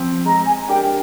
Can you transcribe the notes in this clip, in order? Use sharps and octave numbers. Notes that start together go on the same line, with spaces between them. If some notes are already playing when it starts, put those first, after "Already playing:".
Already playing: F3 C4
G#3 A#5
G#5
D4 G4 A#4 G5